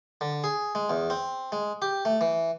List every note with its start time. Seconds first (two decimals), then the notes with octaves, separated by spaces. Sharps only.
0.21 D3
0.44 G#4
0.75 G#3
0.90 E2
1.10 C4
1.52 G#3
1.82 G4
2.05 A3
2.21 E3